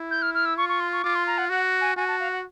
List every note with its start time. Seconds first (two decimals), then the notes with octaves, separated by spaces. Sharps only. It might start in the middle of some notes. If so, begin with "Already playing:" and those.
Already playing: E4
0.11 G6
0.22 F6
0.34 F6
0.46 E6
0.57 F4 C#6
0.69 C#6
0.80 C6
0.92 C#6
1.04 F4 D6
1.15 C6
1.27 A#5
1.38 F#5
1.49 F#4 F#5
1.81 G#5
1.96 F#4 G#5
2.08 A5
2.20 F5
2.32 F#5